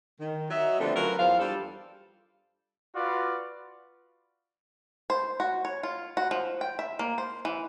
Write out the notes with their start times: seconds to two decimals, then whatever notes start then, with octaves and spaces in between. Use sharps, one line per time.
0.20 D#3
0.50 F#3 D#5 E5
0.80 D3 F3 G3 A3 B3 C4
0.95 F#3 C#4 F4 A#4 B4
1.18 E2 F3 C5 F5
1.39 G3 D4 F4 A4
2.95 F4 F#4 B4 D5
5.10 C5
5.40 F#4
5.65 C#5
5.83 F4
6.17 F#4
6.31 F3
6.61 G5
6.79 E5
6.99 A#3
7.18 C5
7.45 E3